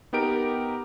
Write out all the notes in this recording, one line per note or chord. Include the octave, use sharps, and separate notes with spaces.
B3 D#4 G4 A#4 D7